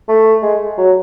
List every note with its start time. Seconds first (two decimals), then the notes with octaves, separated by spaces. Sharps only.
0.08 A3
0.42 G#3
0.78 F#3